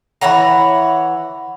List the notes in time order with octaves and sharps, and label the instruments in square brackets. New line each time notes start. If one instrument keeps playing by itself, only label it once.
[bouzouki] E3 C#5 F#5 A#5